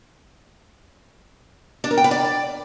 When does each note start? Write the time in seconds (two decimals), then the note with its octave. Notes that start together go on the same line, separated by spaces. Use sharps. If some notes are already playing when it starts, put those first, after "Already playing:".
1.84 D4
1.91 A#4
1.97 G5
2.04 B4
2.11 D5